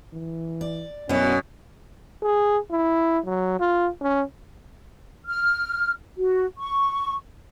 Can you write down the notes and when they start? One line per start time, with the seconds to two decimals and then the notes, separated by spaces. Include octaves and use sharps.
0.13 E3
0.61 D5
1.09 F#2 B2 B3 C#4 E4
2.23 G#4
2.70 E4
3.25 F#3
3.60 F4
4.01 C#4
5.26 F6
6.16 F#4
6.58 C#6